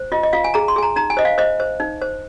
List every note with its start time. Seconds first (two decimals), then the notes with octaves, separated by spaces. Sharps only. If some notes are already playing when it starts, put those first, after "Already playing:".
Already playing: C5
0.12 F4 D#5
0.23 D#5
0.33 F4 F5
0.44 G#5
0.54 G#4 A#5
0.68 C6
0.76 G#4 G#5
0.83 A#5
0.96 D#4 A#5
1.10 G#5
1.17 C5 D#5
1.25 F5
1.38 C5 D#5
1.60 C5
1.80 D#4
2.01 C5